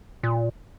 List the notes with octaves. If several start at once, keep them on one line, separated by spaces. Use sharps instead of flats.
A#2